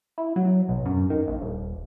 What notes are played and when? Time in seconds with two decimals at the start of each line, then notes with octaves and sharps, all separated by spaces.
0.18 E4
0.36 F#3
0.68 B1
0.85 F#2
1.10 D#3
1.28 A#1
1.41 D#1